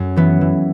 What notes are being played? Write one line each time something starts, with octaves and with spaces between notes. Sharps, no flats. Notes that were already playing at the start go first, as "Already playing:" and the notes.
Already playing: F#2
E3 B3
E3